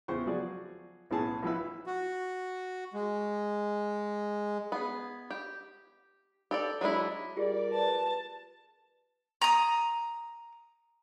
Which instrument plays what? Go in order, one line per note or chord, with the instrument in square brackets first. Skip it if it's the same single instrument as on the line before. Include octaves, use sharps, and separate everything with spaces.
[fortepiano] E2 C#3 C5 C#6
F3 F#3 F#4 G#4 D5
B1 A2 E3 C#4 G#4 A5
B1 E3 F3 E4 B4 E5
[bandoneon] F#4
G#3
[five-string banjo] B3 G#4
G4
G4 A4 D5
F#3 G#3 D4 E4
[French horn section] G3 A#4 D5 [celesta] F4 G4 G#4
[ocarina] B4 [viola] A5
[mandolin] A#5 D#6